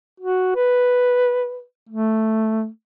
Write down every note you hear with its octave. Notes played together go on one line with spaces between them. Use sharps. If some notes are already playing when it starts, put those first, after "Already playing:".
F#4
B4
A3